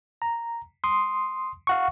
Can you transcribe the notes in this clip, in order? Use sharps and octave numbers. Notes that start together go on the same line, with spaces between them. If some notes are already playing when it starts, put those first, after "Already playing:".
A#5
C6 D#6
F5 F#5 C#6